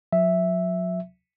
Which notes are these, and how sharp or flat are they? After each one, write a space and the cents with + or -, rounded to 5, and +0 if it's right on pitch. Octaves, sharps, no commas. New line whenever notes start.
F#3 -40 E5 +0